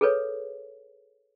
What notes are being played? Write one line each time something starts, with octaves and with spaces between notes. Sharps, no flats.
G#4 A4 B4 C#5